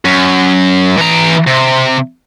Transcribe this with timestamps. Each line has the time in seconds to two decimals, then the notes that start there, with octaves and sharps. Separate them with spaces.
0.05 F#2
0.98 E3 A#5
1.47 C3